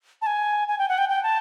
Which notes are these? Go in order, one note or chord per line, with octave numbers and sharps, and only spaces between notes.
A5
G#5
G#5
G5
F#5
G5
G5
A5